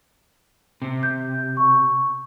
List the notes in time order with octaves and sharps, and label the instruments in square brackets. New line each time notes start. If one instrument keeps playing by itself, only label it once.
[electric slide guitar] C3
[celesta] G6
C#6